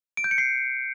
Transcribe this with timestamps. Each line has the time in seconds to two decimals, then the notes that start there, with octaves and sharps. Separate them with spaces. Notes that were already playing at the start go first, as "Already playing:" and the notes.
0.17 D7
0.24 G6
0.31 C#7
0.38 C7